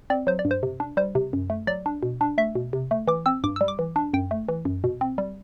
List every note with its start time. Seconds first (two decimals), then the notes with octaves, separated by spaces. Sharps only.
0.10 C4 D5
0.27 F#3 C5
0.39 D5
0.45 G2
0.51 C5
0.63 C3
0.80 D4
0.97 G3 C5
1.15 C3
1.33 F#2
1.50 A3
1.67 F#3 D5
1.86 D4
2.03 B2
2.21 D4
2.38 A3 E5
2.55 B2
2.73 C3
2.91 A3
3.07 E3 D6
3.26 C4 E6
3.44 G2 D6
3.56 G3 E6
3.68 D6
3.79 E3
3.96 D4
4.13 F#2 G5
4.31 A3
4.48 E3
4.65 F#2
4.84 B2
5.01 C4
5.18 G3